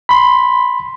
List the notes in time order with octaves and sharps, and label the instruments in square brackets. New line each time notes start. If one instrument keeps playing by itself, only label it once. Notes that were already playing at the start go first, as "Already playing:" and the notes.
[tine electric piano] B5 C6